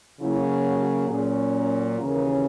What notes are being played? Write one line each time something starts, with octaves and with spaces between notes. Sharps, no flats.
C#3 F#3 A#3 E4
F#4
A#2 F#3 C#4 G#4
A#4
D#2 C#3 E3 A#3 C#4 A#4